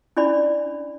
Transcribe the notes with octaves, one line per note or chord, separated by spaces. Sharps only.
C#4 D4 E4 D5 B5